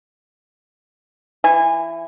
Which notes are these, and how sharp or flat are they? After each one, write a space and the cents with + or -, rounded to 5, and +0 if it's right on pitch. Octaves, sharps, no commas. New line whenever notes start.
E3 +20 G#5 -25